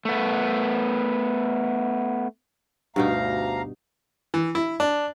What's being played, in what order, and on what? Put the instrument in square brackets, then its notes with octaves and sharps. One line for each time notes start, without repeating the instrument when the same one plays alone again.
[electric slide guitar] A3 B3
[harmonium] D2 F5 A#5 [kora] G2 B2 D#4
[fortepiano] E3
E4
D4